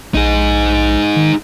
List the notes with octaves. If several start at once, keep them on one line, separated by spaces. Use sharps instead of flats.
A#1 D#4 G#4
D#3